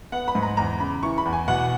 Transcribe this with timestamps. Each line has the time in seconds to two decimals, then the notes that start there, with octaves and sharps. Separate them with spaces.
0.12 B3 F#5
0.28 B5
0.35 G#2
0.43 A#5
0.57 E2 A#5
0.80 C#3 B5
1.03 E3 C#6
1.18 B5
1.25 E2
1.33 G#5
1.48 B2 F#5